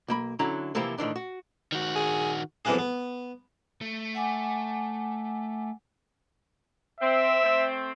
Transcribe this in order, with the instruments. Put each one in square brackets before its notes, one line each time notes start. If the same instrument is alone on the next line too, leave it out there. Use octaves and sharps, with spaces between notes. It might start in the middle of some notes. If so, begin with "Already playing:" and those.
[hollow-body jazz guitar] B1 A#3 B5
D3 F#3 C#4 E4 A#5
C3 E3 F3 A#3 E4 G4
A2 D#3 E3 D4
F#4
[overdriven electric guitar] D#3 F#4
[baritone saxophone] G#4
[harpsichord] F2 B2 E3 A#3 D4 G#4
B3
[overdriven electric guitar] A3
[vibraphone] F#5 G#5 D6
[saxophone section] C4 [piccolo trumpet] E5
[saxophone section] A3 C4